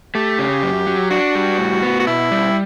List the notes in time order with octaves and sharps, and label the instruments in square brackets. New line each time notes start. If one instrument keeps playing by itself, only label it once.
[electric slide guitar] A3 [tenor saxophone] G4
[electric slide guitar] C#3
F#2
F#3
[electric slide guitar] D4 [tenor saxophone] F#4
[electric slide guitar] G3
A2
B3
[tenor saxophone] F#4
[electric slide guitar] B2 [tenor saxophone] E4
[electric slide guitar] G3